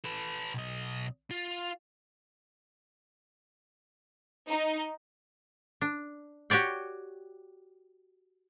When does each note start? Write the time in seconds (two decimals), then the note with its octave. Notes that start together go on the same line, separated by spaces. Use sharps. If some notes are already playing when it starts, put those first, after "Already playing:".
0.05 A4 B4
0.54 B1 D#5
1.31 F4
4.49 D#4
5.81 D4
6.50 F#4 G4 C#5 D5 G5